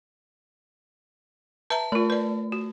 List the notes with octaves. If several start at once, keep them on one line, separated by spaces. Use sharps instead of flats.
B4 E5 A5 A#5
A3 F4 A#4
B4 D5
F#4